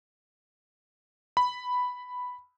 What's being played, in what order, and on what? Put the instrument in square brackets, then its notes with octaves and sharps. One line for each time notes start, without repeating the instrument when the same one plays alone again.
[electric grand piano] B5